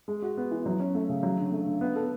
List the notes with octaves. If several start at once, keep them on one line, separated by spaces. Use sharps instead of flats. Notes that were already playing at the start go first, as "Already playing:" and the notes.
G#3
F#4
B3
E3
F#3
C#4
A3
C#3
F#3
D3
A3
D3
B3
A4